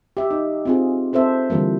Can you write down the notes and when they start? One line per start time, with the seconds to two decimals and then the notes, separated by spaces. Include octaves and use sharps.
0.17 G4 E5
0.31 D#4
0.65 C4 F4 G#4
1.13 C4 A4 C5 E5
1.50 D3 E3 F3 G3 A#3